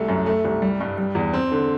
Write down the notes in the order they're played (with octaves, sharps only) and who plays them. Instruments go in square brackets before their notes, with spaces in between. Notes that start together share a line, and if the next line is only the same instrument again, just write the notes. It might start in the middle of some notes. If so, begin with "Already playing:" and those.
Already playing: [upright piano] C2 A3
F#2
A3
C2
G3
G2
G3
E2
C4
D3